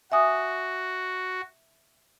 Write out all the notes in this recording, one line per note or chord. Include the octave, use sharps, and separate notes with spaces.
F#4 E5 G#5 D#6